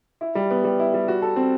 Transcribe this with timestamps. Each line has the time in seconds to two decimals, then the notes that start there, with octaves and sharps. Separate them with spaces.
0.21 E4
0.35 G3
0.50 B3
0.64 G3
0.79 E4
0.94 G3
1.08 F#4
1.22 A4
1.36 C4